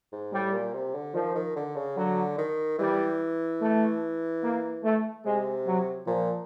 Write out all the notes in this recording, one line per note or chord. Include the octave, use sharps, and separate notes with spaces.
G#2
A2 G3
A#2
C3
D3
D#3 F3
D#3
D3
C#3
D3 F#3
D#3
E3 G3
A3
A#3
A3
C3 G#3
F#3
A#2 F3